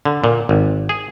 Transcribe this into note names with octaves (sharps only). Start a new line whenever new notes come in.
D3
A#2
G#1
G#4